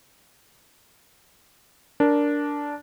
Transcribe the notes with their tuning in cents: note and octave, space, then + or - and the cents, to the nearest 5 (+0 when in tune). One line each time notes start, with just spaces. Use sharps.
D4 -10 A#4 +0